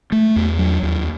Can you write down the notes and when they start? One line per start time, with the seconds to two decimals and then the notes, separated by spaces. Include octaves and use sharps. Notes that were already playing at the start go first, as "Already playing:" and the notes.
0.12 A3
0.36 E2
0.59 F#3
0.83 D#2